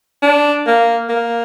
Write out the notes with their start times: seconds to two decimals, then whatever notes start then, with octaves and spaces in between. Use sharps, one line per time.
0.23 D4
0.67 A#3
1.09 A#3